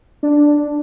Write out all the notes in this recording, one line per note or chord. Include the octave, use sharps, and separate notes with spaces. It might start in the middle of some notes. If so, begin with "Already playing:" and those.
D4